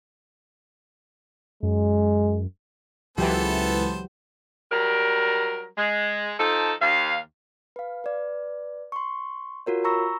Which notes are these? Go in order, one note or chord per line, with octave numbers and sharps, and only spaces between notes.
F#2 G#3
C#2 E3 F#3 B3 G4 A4 C5 C7
F#3 G3 A#4
G#3
F3 D#4 A4
D#2 F5
B4 F5
B4 D5
C6 C#6
F4 F#4 A#4 C#5
A#5 B5 C#6 E6 A#6